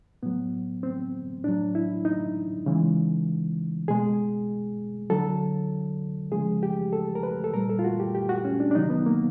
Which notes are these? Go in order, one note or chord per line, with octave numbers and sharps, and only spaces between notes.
A2 F#3 B3
C4
A2 F#3 D4
E4
D#4
C#3 E3 G#3
B2 G#3 G#4
D3 F#3 A4
C#3 F3 G#3 G#4
G4
A4
A#4
B4
A4
A#2 G3 A#4
A4
F4
F#4
G4
G4
F#4
C#4
D4
D4
C3 D#3 F#3 D#4
B3
A#3